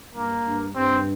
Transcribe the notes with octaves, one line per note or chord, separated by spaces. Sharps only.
G2 A#3
G2
G2 C4